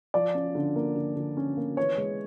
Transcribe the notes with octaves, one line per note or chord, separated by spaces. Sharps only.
F3 D5
C#4
D3
A#3
D3
D3
C#4
A#3
E3 C#5
G#3